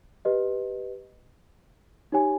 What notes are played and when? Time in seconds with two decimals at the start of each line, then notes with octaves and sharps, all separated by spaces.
0.25 G4 B4 D#5
2.12 D#4 G4 C#5 G#5